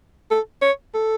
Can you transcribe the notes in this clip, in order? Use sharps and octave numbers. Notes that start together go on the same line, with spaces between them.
A4
C#5
A4